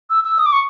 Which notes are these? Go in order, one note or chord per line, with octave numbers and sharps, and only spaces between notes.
E6
E6
D#6
D6
C#6